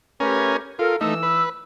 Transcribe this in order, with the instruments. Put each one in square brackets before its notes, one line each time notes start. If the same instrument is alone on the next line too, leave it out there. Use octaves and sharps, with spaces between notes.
[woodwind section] A3 G4 B4 [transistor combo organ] C#4 A#4 G#5
[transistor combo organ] F4 [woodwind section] A4 A#4
[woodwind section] E3 E6 [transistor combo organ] A3 D#4
[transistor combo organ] B4